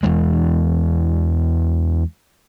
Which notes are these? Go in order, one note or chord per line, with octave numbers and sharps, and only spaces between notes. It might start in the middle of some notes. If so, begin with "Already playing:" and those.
E2 E3 G#3